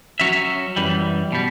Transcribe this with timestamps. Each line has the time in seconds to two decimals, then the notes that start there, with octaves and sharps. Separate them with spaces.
0.20 F#3 C#4 F#4 C#5 E5
0.76 F#2 E3 G3
1.32 B2 G3